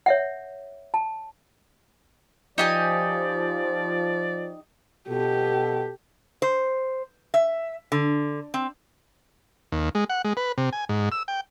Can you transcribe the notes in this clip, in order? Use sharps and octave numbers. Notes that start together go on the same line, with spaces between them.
C#5 E5 F#5
A5
F3 D#4 G4 D5 G#5
B2 G4 A4
C5
E5
D3
C4
D#2
G#3
F#5
G#3
B4
C3
G#5
G#2
E6
G5